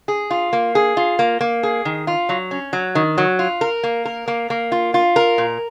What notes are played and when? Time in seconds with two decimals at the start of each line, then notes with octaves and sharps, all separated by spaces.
0.08 G#4
0.30 F4
0.53 A#3
0.75 G#4
0.97 F4
1.19 A#3
1.41 A#3
1.63 G#4
1.85 D#3
2.07 F4
2.29 F#3
2.51 C#4
2.73 F#3
2.95 D#3
3.18 F#3
3.39 F4
3.61 A#4
3.83 A#3
4.05 A#4
4.28 A#3
4.50 A#3
4.72 F4
4.94 F4
5.16 A#4
5.38 A#2